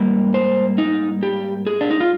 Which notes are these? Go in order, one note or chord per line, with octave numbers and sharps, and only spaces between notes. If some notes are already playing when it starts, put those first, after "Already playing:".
Already playing: G#2 G3 A#3
C5
D#4
G4
G#4
D4
D#4
F4